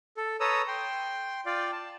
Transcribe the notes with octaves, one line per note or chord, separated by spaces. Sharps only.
A4
A4 B4 C#5 A#5 D#6 E6
G5 C6
F4 D5 F5 G5
A5